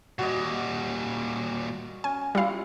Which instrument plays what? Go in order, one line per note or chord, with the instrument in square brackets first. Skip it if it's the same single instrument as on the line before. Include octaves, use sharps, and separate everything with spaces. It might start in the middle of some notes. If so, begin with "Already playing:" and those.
[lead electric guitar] A#2 G3 [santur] F#4 D#5
[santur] C#4 [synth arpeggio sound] G#5
[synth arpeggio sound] G3 F5 [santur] E4 F4